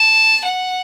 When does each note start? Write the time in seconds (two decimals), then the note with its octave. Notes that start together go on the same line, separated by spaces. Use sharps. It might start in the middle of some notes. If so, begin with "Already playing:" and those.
Already playing: A5
0.45 F#5